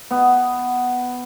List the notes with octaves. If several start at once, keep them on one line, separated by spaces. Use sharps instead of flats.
B3